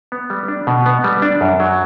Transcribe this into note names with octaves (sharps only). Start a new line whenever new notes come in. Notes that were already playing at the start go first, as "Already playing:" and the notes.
B3
G3
D4
B2
B3
G3
D4
F#2
F#3